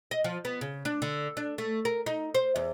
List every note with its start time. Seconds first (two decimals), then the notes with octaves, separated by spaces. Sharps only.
0.11 D#5
0.24 F3
0.45 B3
0.61 C#3
0.85 D4
1.02 D3
1.37 D4
1.58 A3
1.85 A#4
2.06 D#4
2.35 C5
2.56 E2